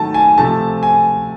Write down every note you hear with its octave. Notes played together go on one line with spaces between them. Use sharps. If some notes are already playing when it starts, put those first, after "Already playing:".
Already playing: D#3 F#3 A3 A5
G#5
C3 F3 A3 A5
G#5